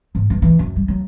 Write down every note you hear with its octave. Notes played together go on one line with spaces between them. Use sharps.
G#2
G2
E3
F#2
G3
F#3